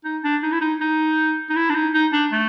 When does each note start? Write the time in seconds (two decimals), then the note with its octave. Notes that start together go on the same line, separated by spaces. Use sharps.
0.05 D#4
0.24 D4
0.43 D#4
0.52 E4
0.61 D#4
0.81 D#4
1.50 D#4
1.55 E4
1.70 D4
1.75 D#4
1.94 D#4
2.13 D4
2.32 A3